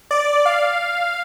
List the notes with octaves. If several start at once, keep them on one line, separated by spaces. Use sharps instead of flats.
D5
F5